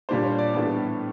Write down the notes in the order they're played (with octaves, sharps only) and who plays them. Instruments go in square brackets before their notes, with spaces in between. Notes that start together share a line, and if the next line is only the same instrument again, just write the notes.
[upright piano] A#2 G3 A#3 D4 C5
C#5
D5
A2 E3 G3 B3 D4